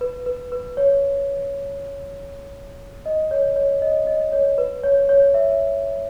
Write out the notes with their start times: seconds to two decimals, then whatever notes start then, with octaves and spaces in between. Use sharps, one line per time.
0.01 B4
0.26 B4
0.52 B4
0.77 C#5
3.06 D#5
3.31 C#5
3.56 C#5
3.82 D#5
4.07 D#5
4.32 C#5
4.58 B4
4.83 C#5
5.09 C#5
5.34 E5